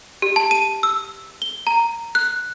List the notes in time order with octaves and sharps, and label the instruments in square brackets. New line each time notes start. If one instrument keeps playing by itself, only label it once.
[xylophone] G4
A5
D#7
E6
G7
A#5
F#6